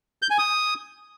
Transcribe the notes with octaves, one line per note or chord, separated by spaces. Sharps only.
G6
G#5
D#6